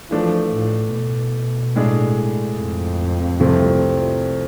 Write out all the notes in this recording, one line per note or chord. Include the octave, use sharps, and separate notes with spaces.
E3 F3 A3 D4
A2
B2
A2 G#3 D4 G#4
F2
C2 C3 F3 A3 C4